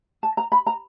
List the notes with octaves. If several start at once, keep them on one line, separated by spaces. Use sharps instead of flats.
A5
A#5
B5
A#5